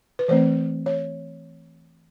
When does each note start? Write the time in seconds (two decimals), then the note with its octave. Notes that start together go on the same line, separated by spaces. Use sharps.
0.19 B4
0.28 E3 A3 C4 C5
0.86 C#5